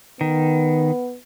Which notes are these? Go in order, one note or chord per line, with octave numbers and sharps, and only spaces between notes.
D#3 B3